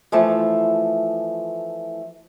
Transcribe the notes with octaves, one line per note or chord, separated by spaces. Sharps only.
E3 F3 A3